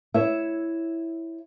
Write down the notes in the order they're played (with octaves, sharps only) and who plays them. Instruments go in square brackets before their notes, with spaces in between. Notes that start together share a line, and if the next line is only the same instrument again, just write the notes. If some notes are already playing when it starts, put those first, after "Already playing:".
[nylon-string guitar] E4 C#5 E5